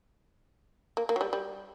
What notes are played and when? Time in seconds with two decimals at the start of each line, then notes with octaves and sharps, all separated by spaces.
0.97 A#3
1.09 A#3
1.16 F#3
1.21 G3
1.33 G3